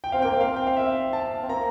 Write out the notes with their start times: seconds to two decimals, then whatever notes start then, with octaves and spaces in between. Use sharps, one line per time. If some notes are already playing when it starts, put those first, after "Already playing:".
0.04 G5
0.12 C4 F5
0.22 A#3 G5
0.33 C4
0.41 F5
0.56 G5
0.67 F5
0.77 E5
1.13 A5
1.43 C4
1.49 A#3 A#5